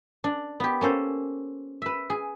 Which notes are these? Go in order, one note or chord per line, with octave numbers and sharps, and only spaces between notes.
D4
B3 G4
A#3 C#4 A4 C5
B4 E5
G#4